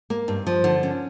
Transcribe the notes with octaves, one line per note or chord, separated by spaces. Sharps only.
A#3
G2
F3
D3
C#4